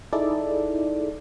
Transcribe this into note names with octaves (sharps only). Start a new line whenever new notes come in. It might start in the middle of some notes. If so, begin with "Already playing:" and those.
D#4 E4 G#4 A4 D5